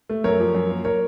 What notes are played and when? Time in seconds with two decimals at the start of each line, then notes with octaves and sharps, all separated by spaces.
0.09 A3
0.24 F#2 A#4 C#5
0.40 F3
0.55 F#2
0.70 A#3
0.85 A#4 C#5